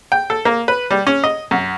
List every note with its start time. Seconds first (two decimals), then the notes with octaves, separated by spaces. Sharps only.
0.12 G5
0.30 A4
0.45 A#3
0.68 B4
0.91 G3
1.07 C#4
1.24 D#5
1.51 F#2